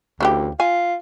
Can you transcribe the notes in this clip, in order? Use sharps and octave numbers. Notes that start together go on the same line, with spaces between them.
D2 C#3 E3 G4
F4 G#5